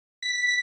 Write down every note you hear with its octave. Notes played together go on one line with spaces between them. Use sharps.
B6